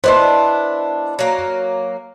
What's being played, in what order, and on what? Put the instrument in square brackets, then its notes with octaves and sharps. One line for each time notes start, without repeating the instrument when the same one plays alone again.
[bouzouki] B3 D4 E4 [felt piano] C5 D#5 C6
[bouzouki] F#3 A#3